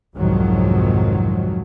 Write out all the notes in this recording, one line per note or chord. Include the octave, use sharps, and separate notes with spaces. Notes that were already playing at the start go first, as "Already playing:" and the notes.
C2 F2 G#2 D#3 F3 F#3